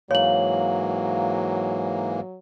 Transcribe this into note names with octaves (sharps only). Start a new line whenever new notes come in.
G#2 E3 F#3 A#3 C#5 F5 F#7